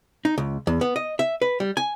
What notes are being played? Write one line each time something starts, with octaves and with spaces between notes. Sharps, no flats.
D#4
C#2
E2
B3
D#5
E5
B4
G3
G#5